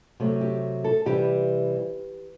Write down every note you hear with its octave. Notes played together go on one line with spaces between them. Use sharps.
C3 F#3 A3
G4
A4
C3 E3 G3 G4